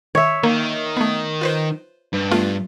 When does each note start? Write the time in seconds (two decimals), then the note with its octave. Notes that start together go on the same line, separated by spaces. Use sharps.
0.15 D#3 C#5 E5
0.43 D#3 A#3
0.97 A3 B3
1.41 F4 B4 C5
2.13 G2
2.31 A3 B3 F4